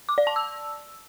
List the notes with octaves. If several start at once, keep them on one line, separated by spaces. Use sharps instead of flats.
D6
D5
A5
E6